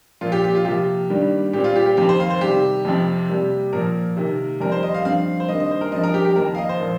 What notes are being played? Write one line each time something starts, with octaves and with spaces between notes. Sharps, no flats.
A#2 F3 A#3 F4
G4
G4
F4
C3 F3 A#3 G4
G2 D#3 G3 A#3
A#2 G3 C4 G4
F4
G4
G4
F2 D#3 C4 G4
C5
F5
C5
C3 D#3 G3 G4
F2 C3 F3 C4
C3 G3 A#3
A#2 F3 A#3 A#4
C3 D#3 A#3
F2 D#3 G3 C4 A#4
C5
D#5
F5
G2 F3 C4 F5
C5
G2 D#3 A#3 D#5
D#5
C5
A#4
G2 F3 C4 D#5
A#4
G4
G4
F2 D#3 A#3 A#4
F5
D#5
C5
A#2 F3